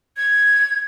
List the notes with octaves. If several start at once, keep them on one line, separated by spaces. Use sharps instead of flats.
G#6